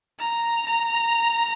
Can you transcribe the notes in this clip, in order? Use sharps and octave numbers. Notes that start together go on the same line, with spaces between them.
A#5
A#5